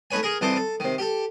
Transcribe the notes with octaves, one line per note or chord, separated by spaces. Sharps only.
A3 D#4 B4 C#5 G#5
G#4 A#4
C2 E3 D#4 A4 C5 D6
A4
C3 D#3
G4 A4